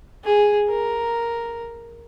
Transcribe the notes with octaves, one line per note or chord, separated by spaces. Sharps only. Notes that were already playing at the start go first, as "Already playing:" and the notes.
G#4
A#4